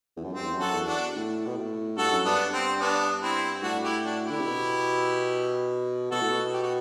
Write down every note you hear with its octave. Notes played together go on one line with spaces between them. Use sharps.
E2
F#2
G2 C4
E2
F#2
F#4 A4
E2
D4 F#4
A2
B2
A2
G2 F#4 A4
F#2
G2 B3 D4
C4
B3 D4
C4 E4
A2 D4 F#4
E4 G4
D4 F#4
D3 E4 G4
C3
B2
B2 F#4 A4
A2
B2
G4
F#4